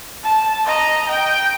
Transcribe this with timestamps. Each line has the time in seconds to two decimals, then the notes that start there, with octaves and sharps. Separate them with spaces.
0.24 A5
0.65 D#5 A#5
1.09 G5